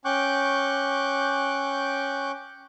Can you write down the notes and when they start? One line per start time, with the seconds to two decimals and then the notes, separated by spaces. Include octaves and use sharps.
0.05 C#4 G5 C#6 D6 F#6 G6